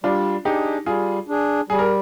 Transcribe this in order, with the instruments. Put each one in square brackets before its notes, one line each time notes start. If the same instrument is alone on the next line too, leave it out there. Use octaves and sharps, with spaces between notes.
[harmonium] G3 [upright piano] D4 F4
[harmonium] D4 G#4 [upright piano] D#4 G4
[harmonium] G3 [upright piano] F4 G#4
[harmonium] D4 G#4
[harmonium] G3 [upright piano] G#4
[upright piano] A#4